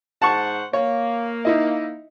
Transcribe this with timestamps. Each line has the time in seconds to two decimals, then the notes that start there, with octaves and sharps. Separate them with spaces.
0.22 G#2 C5 F#5 A5 C#6
0.73 A#3 C#5
1.45 D#4 E4 D#5